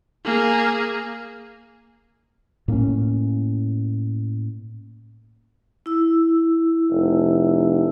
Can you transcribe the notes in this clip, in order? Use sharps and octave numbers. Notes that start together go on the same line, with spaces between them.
A#3 G#4
A2 A#3 C4 C#4
E4 E6
F1